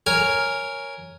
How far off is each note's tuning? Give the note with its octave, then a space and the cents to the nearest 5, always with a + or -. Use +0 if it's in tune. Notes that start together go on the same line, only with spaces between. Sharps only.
A#4 +0 C#5 +0 G#5 +0